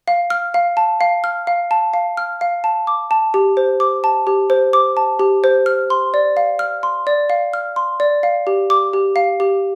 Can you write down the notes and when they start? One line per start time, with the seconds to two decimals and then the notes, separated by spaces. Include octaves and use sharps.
0.08 F5
0.30 F6
0.54 F5
0.77 A5
1.01 F5
1.24 F6
1.47 F5
1.71 A5
1.94 F5
2.17 F6
2.41 F5
2.64 A5
2.87 D6
3.11 A5
3.34 G4
3.57 C5
3.80 D6
4.04 A5
4.27 G4
4.50 C5
4.73 D6
4.97 A5
5.19 G4
5.44 C5
5.66 F6
5.90 C6
6.14 D5
6.37 F5
6.59 F6
6.83 C6
7.07 D5
7.30 F5
7.54 F6
7.76 C6
8.00 D5
8.23 F5
8.47 G4
8.70 D6
8.93 G4
9.16 F5
9.40 G4